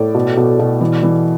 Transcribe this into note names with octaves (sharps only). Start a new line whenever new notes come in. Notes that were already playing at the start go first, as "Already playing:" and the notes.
Already playing: A2 D5
B2
B2
B2
E3
E3